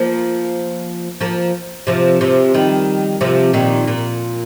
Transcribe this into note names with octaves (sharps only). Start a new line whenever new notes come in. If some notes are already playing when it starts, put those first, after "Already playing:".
Already playing: F3 A#3
F3 A#3
C3 F3
C3 F3
D#3 G3
C3 F3
A#2 D#3
A#2